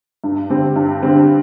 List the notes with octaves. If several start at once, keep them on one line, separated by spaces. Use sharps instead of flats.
G2
D3 G3 C4
G2
D3 G3 C4